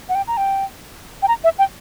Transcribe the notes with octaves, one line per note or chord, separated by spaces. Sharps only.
F#5
G5
A#5
G5
G5
A#5
E5
G5